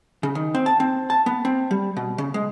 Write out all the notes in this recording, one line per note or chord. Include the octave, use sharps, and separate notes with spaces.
C#3
D#3
C4
A5
C4
A5
B3
C4
G3
B2
C#3
G#3